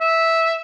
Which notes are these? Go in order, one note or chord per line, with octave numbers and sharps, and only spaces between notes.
E5